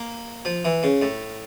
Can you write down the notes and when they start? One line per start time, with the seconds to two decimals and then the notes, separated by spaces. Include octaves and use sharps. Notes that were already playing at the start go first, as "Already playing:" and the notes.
Already playing: A#3
0.45 F3
0.65 E3
0.83 C#3
1.02 A2